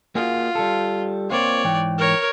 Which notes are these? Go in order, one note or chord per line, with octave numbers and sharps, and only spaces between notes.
A#3 F4 F#4 G#4
G3 A4
A#3 C4 F4 C#5 D5
G#2 E3 G5
A#4 C#5